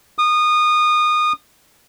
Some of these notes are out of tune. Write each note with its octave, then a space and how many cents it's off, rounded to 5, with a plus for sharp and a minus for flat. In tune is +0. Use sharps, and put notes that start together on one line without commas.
D#6 -25